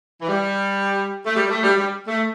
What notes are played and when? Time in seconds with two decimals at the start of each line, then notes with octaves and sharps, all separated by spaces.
0.22 E3
0.29 G3
1.26 A3
1.36 G3
1.50 A3
1.63 G3
1.77 G3
2.08 A3